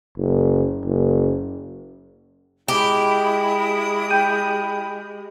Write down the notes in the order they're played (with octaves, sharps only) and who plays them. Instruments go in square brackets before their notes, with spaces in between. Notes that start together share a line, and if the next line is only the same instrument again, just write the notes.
[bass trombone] F#1
F#1
[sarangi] G#3 [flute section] E4 B5 D#6 [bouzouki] G4
[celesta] G5 G6 D#7